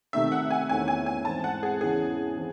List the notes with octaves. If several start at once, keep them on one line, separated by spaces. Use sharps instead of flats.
C3 D#3 A3 D#4 E5
F#5
G#5
E2 D#3 A3 C#4 E4 G#5
G#5
G#5
G#2 E3 C4 A5
F#5
G#4
E2 C#3 E3 G#3 C#4 G#4
E3 C4